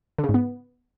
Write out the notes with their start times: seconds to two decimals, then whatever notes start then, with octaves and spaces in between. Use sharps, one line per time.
0.18 D3
0.24 C#3
0.29 G#2
0.34 B3